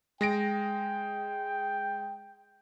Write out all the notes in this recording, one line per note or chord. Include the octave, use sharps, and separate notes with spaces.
G#3 G5 A#6 D7